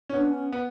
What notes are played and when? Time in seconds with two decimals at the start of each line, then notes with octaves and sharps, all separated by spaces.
0.09 C#4
0.14 B3 D4
0.30 C#4
0.52 B3